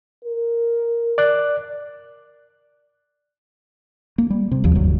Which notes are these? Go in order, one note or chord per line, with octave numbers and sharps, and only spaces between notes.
A#4
D5 F#6
A#3
G3
C3
F1 D#2 F3 G3
D1 D2 G2 F#3